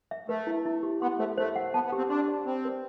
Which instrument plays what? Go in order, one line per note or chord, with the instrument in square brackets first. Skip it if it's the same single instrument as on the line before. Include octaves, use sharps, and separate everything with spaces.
[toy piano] E5
[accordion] A3 [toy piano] B4
[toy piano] E4
E4
G4
[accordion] B3 [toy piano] C6
[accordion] A3 [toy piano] C5
[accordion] A3 [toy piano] C5
[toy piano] F#5
[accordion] B3 [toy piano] A5
[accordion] B3
[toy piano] G4
[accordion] C4
[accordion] D4 [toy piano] C6
[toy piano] D5
[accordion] C4 [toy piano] B5
[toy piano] B4